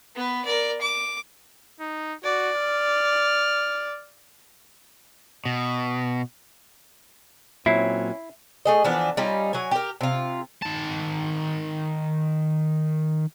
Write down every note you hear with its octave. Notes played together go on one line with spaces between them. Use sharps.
B3 B4
A#4 D5
D6
D#4
F#4 D5
F6
B2
A#2 F#3 C4 C#4 E4 E5 G#5 C7
A3 G#4 D#5
E3 F3 B3 D4
G3 C#4 D#4 F4
F#3 G#5
G4 A#4
C3 F4
D#3 A5